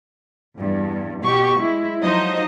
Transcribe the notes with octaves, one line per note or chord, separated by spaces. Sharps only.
E2 G2
B2 G4 C#6
G#3 E4
F3 F#3 D#4 C5 D#5